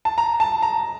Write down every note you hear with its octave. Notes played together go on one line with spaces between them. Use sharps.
A5
A#5
A5
A#5